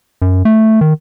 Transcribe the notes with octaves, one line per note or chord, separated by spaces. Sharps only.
F#2
A3
D#3